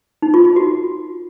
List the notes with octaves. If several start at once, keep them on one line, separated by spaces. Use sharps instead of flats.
D#4
F4
F4
F#4